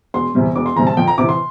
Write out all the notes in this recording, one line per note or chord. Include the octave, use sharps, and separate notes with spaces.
E1 C6
E2 C3 G3
E1 D6
C6
E2 C3 G3 A#5
A5
F2 G5
A#5
C3 E3 D6
C6